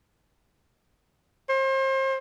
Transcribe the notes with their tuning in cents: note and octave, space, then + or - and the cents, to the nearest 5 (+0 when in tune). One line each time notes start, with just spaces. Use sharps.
C5 +35